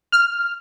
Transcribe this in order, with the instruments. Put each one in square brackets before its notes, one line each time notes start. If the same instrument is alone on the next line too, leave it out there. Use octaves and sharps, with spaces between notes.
[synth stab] F6